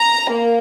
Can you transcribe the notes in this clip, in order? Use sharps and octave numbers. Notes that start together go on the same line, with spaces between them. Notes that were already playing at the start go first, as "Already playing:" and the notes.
Already playing: A#5
A#3